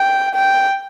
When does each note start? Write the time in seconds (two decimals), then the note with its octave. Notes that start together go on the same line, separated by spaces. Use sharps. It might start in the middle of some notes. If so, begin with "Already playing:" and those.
Already playing: G5
0.35 G5